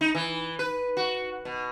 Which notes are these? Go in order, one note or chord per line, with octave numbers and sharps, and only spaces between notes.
D#4
E3
B4
F#4
B2